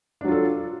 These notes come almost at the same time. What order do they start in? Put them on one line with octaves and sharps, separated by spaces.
D4 F#3 F4 A4